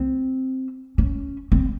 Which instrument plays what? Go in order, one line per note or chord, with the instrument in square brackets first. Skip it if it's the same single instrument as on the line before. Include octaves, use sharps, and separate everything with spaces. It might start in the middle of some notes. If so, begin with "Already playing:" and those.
Already playing: [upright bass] C4
C#4
C4